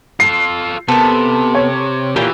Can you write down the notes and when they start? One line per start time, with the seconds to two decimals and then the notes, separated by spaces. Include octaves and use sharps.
0.20 F4 A4 C7
0.88 C3 B3 A4 A#4
1.55 C#5
2.16 A#2 E3 A#3 F4 G4 G5